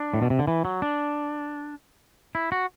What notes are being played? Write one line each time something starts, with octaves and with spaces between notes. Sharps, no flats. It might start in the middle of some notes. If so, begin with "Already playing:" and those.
Already playing: D4
A2
B2
C3
D3
E3
F#3
D4
E4
F#4